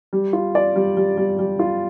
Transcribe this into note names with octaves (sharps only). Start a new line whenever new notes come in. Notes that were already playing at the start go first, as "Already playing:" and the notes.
G3
F4
D5
G3
G3
G3
G3
F4